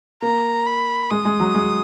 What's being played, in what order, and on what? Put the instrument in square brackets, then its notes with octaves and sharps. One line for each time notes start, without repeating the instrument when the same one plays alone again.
[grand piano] A#3 [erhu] A#5
[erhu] B5
[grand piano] G#3 [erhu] D#6
[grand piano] G#3
F#3
G#3